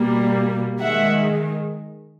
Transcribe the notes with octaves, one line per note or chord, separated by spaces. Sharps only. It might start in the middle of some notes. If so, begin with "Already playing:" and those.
Already playing: B2 G3 A#3
D#3 G#3 E5 F#5